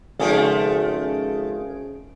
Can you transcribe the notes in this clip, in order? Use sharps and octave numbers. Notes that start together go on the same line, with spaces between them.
G#1 C#3 F3 A3 G#4 A4 D7